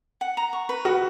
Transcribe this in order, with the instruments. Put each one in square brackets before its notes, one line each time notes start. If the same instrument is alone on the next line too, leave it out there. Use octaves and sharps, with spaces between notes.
[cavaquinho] F#5
A#5
C#6
B4
[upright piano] F#4 [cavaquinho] F#5